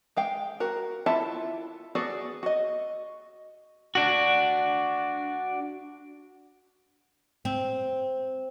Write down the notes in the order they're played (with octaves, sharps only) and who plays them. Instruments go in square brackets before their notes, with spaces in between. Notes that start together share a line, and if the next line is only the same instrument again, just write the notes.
[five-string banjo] G#3 F5 G5
F#4 A#4
E4 F4 A4 E5 A5
B3 F#4 G#4 A4 D5
F#4 D#5
[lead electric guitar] D4 F#4
[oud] C4